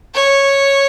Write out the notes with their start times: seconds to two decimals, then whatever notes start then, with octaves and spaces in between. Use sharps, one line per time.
0.15 C#5